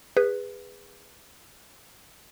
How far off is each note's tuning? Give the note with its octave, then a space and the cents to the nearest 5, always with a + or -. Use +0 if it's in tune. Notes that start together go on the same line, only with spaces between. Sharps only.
G#4 -25 B4 +0